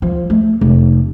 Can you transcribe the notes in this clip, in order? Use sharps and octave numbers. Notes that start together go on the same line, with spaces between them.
F3
A3
F1